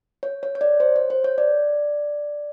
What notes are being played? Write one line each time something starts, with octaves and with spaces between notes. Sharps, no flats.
C#5
C#5
C#5
D5
C5
C#5
C5
C#5
D5